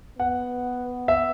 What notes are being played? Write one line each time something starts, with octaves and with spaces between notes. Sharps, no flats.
B3 F#5
E5